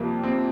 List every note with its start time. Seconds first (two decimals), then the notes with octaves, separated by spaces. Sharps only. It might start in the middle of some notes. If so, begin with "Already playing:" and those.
Already playing: F2 C3 G3 A#3
0.23 C4